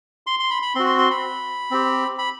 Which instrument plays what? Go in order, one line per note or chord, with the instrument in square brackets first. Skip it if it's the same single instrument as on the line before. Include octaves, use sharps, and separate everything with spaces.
[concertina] C6
C6
B5
B5
C4 F#4 C6
C6
C6
B5
C4 G4
B5